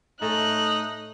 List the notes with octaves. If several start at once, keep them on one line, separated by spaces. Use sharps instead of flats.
A2 A3 D#4 F#6